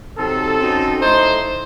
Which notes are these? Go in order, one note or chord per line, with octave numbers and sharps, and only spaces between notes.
C3 F#3 C4 D#4 A4
F#2 F#3 C4 D#4
A2 A3 D#4 C5